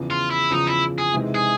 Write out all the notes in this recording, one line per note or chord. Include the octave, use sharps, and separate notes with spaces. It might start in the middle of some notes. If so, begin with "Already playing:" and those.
Already playing: E2 C#3 F3
F4
E4
E2 C#3 F3 D#4
E4
G#4
C3 E3 G#3 C4 D#4
G#4